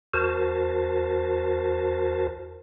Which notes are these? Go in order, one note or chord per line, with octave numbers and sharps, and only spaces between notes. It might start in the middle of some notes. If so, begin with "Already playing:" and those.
E2 F#4 A#4 C5 A5